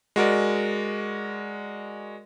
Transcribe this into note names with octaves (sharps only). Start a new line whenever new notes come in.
G#3 F#4 A#4 D5